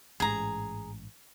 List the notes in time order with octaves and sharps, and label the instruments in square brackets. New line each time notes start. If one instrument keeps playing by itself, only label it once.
[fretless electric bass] A1 G#2 [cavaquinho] G#4 A#5